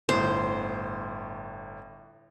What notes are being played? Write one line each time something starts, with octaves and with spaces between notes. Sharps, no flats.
G1 A2 C5